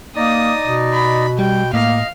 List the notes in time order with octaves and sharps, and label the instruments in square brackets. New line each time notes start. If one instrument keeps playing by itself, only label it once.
[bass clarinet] A#3 [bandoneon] D#4 D5 D#5 [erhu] D#6
[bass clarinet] B2
[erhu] B5
[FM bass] G3 [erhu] G5
[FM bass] A2 [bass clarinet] A#3 [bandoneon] D#5 [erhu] F5